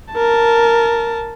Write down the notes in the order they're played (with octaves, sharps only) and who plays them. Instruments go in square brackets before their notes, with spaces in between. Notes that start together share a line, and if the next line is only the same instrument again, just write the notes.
[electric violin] A#4 A5